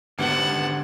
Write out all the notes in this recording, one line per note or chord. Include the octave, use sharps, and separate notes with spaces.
G#1 D3 B3 G4 C5 F#5 A5 F6